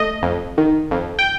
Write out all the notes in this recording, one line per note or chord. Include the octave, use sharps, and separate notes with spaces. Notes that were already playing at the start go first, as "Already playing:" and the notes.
Already playing: A3 D#5
F2
D#3
F2
G5